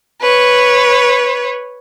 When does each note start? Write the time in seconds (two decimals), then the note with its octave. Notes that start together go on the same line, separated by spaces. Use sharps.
0.21 B4 C#5